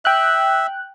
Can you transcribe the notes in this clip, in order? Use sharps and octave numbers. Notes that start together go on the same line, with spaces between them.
E5 G5 F#6